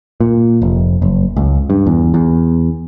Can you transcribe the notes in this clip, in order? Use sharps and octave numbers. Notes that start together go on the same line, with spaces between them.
A#2
F1
F#1
C#2
G2
E2
E2